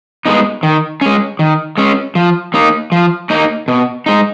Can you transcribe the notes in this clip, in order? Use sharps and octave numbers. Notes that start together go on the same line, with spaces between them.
G#3 B3 D#4
D#3
G#3 C#4
D#3
G#3 C#4
F3
A#3 D#4
F3
A#3 D#4
B2
G#3 D#4